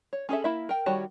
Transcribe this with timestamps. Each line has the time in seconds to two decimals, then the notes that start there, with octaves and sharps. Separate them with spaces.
0.13 C#5
0.29 C#4 G#4 A4 E5
0.44 A#3 E4 E5
0.69 A#4 G5
0.86 D#3 G3 F#4 C#5 A5